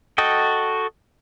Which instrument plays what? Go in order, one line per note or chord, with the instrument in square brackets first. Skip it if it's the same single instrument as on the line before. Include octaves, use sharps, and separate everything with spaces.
[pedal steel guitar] F#4 A4 D#5 G5